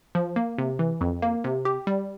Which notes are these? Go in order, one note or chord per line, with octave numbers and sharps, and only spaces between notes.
F3
A#3
C3
E3
F2
A#3
C3
G4
G3